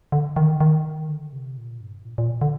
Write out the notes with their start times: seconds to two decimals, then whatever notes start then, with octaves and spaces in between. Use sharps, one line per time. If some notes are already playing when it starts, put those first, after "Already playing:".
0.12 D3
0.36 D#3
0.61 D#3
1.09 D3
1.33 C3
1.58 A#2
1.81 G2
2.05 A#2
2.18 A#2
2.41 D3